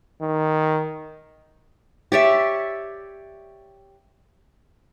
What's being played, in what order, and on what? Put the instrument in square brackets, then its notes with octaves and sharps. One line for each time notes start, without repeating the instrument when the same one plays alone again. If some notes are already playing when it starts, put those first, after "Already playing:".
[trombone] D#3
[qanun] G4 C#5 D5 E5